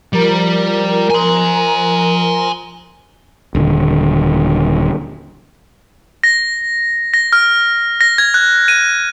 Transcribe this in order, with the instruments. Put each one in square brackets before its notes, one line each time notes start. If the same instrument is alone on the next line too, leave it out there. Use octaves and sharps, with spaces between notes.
[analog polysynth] F3 A#4 A#5 [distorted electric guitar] G3
[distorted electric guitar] G#5 C6
[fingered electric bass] D#1 D3
[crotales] A#6
A#6
F6
A#6
G#6
F#6
D#7